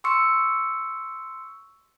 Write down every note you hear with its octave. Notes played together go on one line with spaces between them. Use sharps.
C6 C#6 E6 C#7